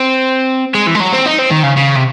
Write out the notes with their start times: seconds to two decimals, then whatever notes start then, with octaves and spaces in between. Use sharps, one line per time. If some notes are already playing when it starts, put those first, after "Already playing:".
Already playing: C4
0.74 G#3
0.87 E3
0.95 G#3
1.00 F#3
1.12 C4
1.26 D#4
1.38 C4
1.51 D#3
1.63 C#3
1.77 C#3
1.96 C3